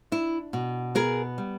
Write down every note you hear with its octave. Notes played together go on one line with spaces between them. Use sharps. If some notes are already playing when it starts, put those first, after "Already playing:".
D4 E4
B2
B3 G#4 A#4
G3